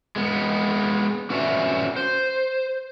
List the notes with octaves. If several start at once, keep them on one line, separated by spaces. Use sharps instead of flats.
G#3 B3
C#4 F#4 B4 C#5 D5 E5
C5